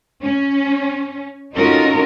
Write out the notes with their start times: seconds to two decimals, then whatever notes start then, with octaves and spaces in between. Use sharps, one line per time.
0.22 C#4
1.55 C#4 D#4 F4 F#4 A4 A#4